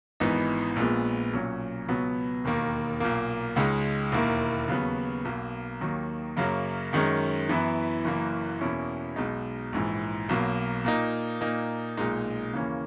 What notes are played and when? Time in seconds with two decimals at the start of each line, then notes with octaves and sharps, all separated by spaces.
0.20 G#1 G#2 E3 B3 D#4
0.76 A#1 A#2 G#3 B3
1.33 B1 A#2 F#3 C#4
1.88 C#2 B2 F#3 B3
2.45 E1 D#2 D#3 A#3
3.00 B1 A#2 A#3
3.56 C#2 C#3 G#3 D#4
4.12 E1 D#2 D#3 A#3 E4
4.68 D#2 C#3 F#3 B3
5.25 B1 B2 A#3
5.81 D#2 D#3 F#3 A#3
6.37 F#2 C#3 F#3 A#3
6.93 F#2 D#3 G#3 C#4
7.49 F#2 E3 B3 E4
8.04 F#1 F#2 E3 A#3
8.61 E2 B2 A#3 C#4 E4
9.16 B1 B2 G#3 D#4
9.73 A#1 G#2 E3
10.29 B1 B2 F#3 A#3
10.85 A#2 A#3 D#4
11.41 A#2 A#3 D#4
11.97 B1 A#2 G#3 D#4
12.53 D#2 C#3 E3 A#3 C#4